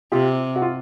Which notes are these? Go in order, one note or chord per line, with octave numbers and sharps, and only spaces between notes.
C3 F4 G4
F#4
F4